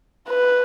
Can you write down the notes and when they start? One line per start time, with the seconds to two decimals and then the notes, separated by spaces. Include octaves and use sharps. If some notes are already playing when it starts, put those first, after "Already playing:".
0.29 B4